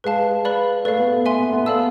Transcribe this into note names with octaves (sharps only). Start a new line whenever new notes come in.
G#3 B4 F5 A5
B4 D5 F5 B5
A3 B4 D5 F5
B3
A3
E5 G#5 C6
B3
B3
A3 A4 D5 F5 A5 E6